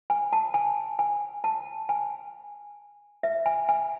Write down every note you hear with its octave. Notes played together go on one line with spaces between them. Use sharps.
G#5
A5
G#5
G#5
A5
G#5
E5
G#5
G#5